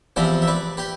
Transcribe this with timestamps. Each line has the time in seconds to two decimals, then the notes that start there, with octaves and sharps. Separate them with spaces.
0.16 E2 C3 F3 B4 D5
0.42 E5
0.47 B4 D5
0.77 G4 B4